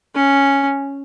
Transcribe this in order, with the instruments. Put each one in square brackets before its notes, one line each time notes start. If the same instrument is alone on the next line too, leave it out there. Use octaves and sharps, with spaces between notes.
[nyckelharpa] C#4